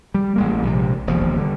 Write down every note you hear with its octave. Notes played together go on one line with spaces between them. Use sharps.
G3
A1 G#3 A#3
A#1 C3
E1 D#2 F3
D3 G3